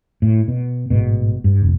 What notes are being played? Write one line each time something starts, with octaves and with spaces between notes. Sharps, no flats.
A2
B2
A1 G#2 B2
G2
F1 A#1